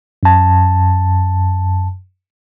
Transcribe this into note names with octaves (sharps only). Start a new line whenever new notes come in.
F#2 A5